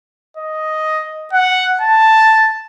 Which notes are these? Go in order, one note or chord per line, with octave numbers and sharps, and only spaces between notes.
D#5
F#5
A5